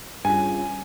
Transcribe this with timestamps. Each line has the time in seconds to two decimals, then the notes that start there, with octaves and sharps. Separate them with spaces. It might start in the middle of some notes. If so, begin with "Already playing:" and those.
0.25 G2 C#3 F4 G#5